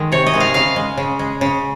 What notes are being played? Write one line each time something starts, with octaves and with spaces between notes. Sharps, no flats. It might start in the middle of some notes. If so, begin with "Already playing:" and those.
Already playing: D#3 G#3
C3 C#5
D#5
D#3 G#3
F5
C#3 F5
G#3
C#3
G#3
C#3